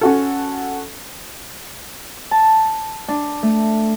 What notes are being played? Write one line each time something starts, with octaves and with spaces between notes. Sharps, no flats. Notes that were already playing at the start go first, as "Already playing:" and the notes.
C#4 F#4 A4
A5
D4
A3